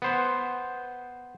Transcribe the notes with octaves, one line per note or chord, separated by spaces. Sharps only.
B3 C5